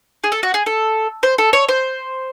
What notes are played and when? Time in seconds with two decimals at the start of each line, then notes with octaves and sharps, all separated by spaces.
0.24 G#4
0.32 A4
0.43 F#4
0.54 G#4
0.66 A4
1.23 C5
1.38 A4
1.53 C#5
1.69 C5